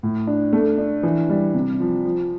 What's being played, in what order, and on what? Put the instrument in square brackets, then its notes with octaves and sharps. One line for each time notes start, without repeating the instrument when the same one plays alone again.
[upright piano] A2
D4
A3
D4
E3
G3
C3
F3
F3